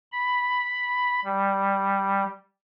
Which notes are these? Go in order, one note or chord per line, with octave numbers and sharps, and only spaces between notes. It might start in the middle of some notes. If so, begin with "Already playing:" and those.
B5
G3